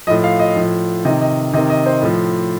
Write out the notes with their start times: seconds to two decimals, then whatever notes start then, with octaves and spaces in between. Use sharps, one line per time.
0.07 A2 F3 D#5
0.24 F5
0.40 D#5
0.56 A2 F3
1.05 C3 D#3 D#5
1.21 D#5
1.53 C3 D#5
1.58 D#3
1.70 D#5
1.86 C5
2.02 A2 F3